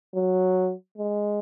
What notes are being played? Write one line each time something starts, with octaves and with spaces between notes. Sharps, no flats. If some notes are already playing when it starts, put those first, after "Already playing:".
F#3
G#3